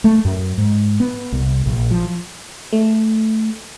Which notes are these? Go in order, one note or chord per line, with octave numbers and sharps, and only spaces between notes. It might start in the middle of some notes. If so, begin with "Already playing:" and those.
A3
F#2
G#2
B3
C2
A#1
F3
A3